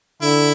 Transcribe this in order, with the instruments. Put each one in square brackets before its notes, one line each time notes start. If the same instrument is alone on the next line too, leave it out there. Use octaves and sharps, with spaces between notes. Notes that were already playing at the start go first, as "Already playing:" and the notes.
[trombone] D3 [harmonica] E4